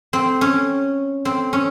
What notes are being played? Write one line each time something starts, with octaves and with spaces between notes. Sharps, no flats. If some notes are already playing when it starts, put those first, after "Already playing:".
C4
C#4
C4
C#4